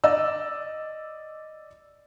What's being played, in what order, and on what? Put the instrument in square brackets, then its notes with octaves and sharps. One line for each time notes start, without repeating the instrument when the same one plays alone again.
[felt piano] D5 D#5 E6